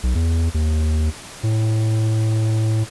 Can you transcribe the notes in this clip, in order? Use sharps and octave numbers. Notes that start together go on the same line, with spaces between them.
B1
E2
D#2
A2